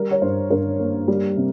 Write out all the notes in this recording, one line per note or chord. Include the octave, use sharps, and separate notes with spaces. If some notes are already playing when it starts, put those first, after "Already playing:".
Already playing: G3 A#4
C#5
G2 C5
G2 A#4
A#3
G3
C3